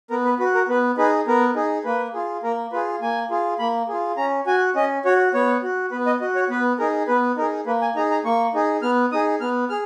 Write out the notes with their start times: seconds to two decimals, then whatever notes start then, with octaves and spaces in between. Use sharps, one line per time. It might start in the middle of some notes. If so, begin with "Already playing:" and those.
0.10 B3 A#4
0.25 B4
0.39 F#4 B4
0.55 A#4
0.68 B3 B4
0.98 D#4 G#4 B4
1.27 B3 A#4
1.55 D#4 G#4
1.84 A#3 B4
2.14 F4 G#4
2.43 A#3 A#4
2.72 F4 G#4 B4
3.01 A#3 G#5
3.30 F4 G#4
3.59 A#3 B5
3.88 F4 G#4
4.17 C#4 A#5
4.47 F#4 G#5
4.75 C#4 D#5
5.05 F#4 C#5
5.34 B3 C#5
5.63 F#4
5.91 B3 B4
6.06 D#5
6.21 F#4 D#5
6.35 C#5
6.50 B3 B4
6.79 D#4 G#4 A#4
7.08 B3 B4
7.37 D#4 G#4 A#4
7.66 A#3 B4
7.81 G#5
7.96 D#4 G#4 A#5
8.11 A#5
8.24 A#3 C#6
8.54 D#4 G#4
8.82 B3 F6
9.12 D#4 G#4 D#6
9.41 B3 F6
9.69 G#4 F6